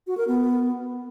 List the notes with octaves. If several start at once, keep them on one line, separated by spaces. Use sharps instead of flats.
F#4
A#4
B3